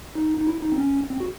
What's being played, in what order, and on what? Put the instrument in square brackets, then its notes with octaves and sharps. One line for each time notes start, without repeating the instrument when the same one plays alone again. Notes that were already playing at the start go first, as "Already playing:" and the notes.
[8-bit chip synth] D#4
D#4
E4
D#4
C4
C#4
C4
F#4